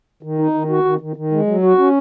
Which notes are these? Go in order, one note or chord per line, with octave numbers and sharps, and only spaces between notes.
D#3
D#4
D#3
F#4
D#3
D#3
D#3
G#3
F#3
F#4
C#4